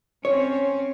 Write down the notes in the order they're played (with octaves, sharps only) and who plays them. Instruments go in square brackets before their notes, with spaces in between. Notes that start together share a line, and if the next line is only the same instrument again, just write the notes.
[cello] C4 C#4 [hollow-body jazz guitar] C#5